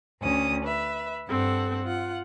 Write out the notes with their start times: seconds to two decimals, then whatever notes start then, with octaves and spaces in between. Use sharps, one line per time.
0.23 D2 C#4 D#6
0.64 B4 E5
1.29 G2 C4 A4 F#5
1.85 F4 F#5